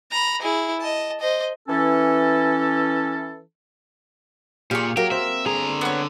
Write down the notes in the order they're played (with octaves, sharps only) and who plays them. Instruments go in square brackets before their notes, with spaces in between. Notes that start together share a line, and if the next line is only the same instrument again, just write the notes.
[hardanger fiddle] A#5 B5
E4 G#4
D#5 A5
C5 D#5
[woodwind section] E3 C#4 A4
[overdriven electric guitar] A#2 [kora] G4 G#4 [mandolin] F5 C#6
[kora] F#3 A#3 [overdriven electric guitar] G4 [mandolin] A#4
[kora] C4 [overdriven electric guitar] E5
[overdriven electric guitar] D3 A#5 [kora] G#4
[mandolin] B3 C#5